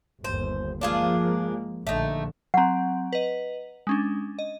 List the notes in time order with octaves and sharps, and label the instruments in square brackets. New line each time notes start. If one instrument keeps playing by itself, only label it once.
[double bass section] G1 D#2 [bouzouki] C5
[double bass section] F3 G#3 A#3 [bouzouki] D4 F4 G#4
[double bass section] A#1 D3 [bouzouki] A3 D#4
[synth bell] F#3 C4 [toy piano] F#5 A#5
[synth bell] B4 D#5
G#3 C#4 D4
D#5